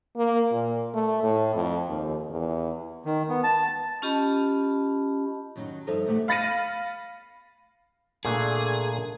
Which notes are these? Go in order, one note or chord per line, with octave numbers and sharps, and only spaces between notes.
A#3
A#2
A3
A2
F2
D#2
E2
D#3
B3
A5
C#4 F4 G4 D#5 A5 B5
F#2 D#3 F#3 D#4
G2 F3 D#4 A4 C5 E5
E2 D3 A3 G4 E5 F#5
F5 B5 A6 A#6 C#7 D#7
A#2 A3 D4 G#4